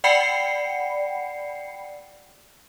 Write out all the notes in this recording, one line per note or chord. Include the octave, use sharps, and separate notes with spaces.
D5 F#5 G5 B5 C7 C#7